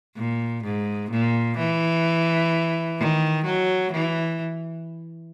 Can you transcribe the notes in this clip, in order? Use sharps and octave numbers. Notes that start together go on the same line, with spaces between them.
A#2
G#2
A#2
E3
D#3
F#3
E3